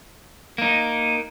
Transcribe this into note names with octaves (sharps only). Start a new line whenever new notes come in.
A#3 D#4